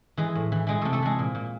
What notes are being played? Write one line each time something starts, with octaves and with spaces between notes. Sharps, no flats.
E3 G#3 G#4
A2
E3
E3 G#3 G#4
C3 A3 A4
A3 A4
E3 G#3 G#4
A#2
A#2